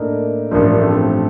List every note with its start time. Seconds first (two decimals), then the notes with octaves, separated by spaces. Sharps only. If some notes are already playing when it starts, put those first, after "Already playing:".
Already playing: A2 A3 A#3 D4 D#4 A#4
0.51 A1 G2 F3 A#3 D4
0.66 A#3 D4
0.80 A3 C4
0.94 A3 C4